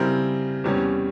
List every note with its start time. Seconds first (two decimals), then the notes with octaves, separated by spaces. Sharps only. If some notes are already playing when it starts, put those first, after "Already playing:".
Already playing: C#3 G3 C4 E4 A#4
0.64 E2 C3 G3 C#4